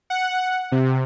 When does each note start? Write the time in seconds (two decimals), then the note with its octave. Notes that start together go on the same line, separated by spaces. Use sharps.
0.10 F#5
0.72 C3